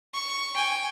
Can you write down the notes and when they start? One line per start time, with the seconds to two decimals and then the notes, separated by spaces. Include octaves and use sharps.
0.14 C#6
0.55 G5 G#5